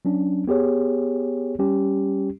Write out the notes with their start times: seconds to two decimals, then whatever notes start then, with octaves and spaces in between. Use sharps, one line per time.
0.05 F#3 C#4 D4
0.48 B3 G4 G#4 C#5
1.59 G3 C#4 G4